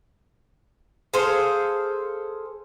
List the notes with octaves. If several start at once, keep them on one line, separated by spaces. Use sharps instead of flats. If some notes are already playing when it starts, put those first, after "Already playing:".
G#4 A4 C5 F5